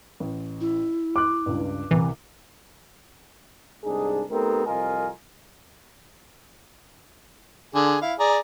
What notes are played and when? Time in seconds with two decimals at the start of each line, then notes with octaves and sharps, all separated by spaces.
0.20 A1
0.61 E4
1.16 C6 D6 F#6
1.46 C#2 G2
1.91 C2 C3 E3
3.84 C2 G#2 D4 D#4 G#4
4.30 A3 B3 C4 D#4 G4 A#4
4.66 C2 F2 F4 A#4 D#5 G#5
7.75 D3 G#4 G#5
8.01 E4 F5
8.20 G#4 D5 A#5